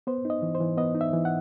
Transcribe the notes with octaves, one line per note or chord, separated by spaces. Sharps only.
B3 C5
D#4
D#5
E3
C5
E3
B3 D#5
D#4
E5
E3
F#5